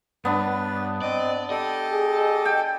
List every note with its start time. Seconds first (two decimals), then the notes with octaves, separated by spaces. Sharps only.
0.25 G2 B3 D4 B4
1.02 C4 D5 D#5
1.50 G4 A4 D#5
1.92 G#4
2.45 G5